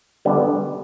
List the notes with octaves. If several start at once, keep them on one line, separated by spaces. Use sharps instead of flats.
D3 G3 B3 D4